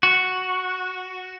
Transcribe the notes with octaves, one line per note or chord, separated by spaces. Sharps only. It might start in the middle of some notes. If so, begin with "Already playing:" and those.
F#4